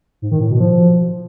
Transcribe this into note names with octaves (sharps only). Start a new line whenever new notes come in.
G#2
D#3
A2
B2
F3